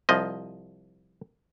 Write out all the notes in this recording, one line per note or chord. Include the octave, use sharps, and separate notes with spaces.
C2 F3 D#5